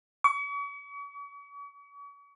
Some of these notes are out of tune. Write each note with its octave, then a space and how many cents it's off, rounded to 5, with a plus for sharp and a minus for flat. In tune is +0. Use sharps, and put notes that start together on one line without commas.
C#6 +45